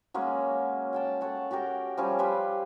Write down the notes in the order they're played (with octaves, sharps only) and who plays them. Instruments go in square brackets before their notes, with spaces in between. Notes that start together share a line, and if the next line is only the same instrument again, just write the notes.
[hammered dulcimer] F#3 G#3 A#3 C#4
F#5 G5 A5
A4 C#5 F#5
F#4 G4 A#4 G5
F3 G3 C#4 G#4
G4 B4 C5 F5